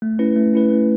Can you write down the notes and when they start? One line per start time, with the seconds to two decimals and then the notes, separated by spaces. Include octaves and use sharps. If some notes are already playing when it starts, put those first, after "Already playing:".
0.02 A3
0.19 C#4 E4 B4
0.36 A3
0.53 C#4 E4 B4
0.70 A3